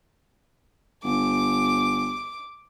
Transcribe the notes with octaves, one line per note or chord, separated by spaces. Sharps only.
G1 D6